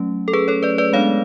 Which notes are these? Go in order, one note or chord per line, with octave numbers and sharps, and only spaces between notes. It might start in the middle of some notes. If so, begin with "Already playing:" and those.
Already playing: F#3 A3 C#4
A4
G#4 B4
A4 C#5
B4 D5
B4 D5
G#3 B3 D4 C#5 F5